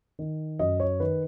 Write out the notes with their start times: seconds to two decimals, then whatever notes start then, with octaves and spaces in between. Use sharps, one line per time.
0.19 D#3
0.59 F#2 D#5
0.80 C#5
1.00 D#3 B4